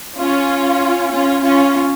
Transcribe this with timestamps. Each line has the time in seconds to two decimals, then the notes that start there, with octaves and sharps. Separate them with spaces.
0.19 C#4 F4
1.12 C#4 F4
1.43 C#4 F4